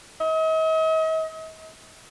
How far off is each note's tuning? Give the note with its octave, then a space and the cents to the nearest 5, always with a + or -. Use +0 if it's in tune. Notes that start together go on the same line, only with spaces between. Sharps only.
D#5 +40